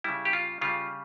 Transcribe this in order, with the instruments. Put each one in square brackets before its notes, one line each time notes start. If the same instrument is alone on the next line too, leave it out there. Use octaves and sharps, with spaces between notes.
[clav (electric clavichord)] C#3 G3 E4
G4
F4
C#3 G3 F4